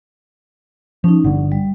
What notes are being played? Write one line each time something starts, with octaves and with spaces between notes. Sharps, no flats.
F3 C#4 D#4
G1 D3 F#5
G3